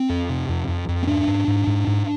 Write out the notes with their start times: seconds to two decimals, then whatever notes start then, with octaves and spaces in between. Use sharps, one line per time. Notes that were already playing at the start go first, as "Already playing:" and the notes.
Already playing: C4
0.09 F2
0.29 C3
0.49 F2
0.68 F2
0.88 F2
1.03 C4
1.07 G#2 D4
1.27 G#2
1.48 G#2
1.67 G#2
1.87 G#2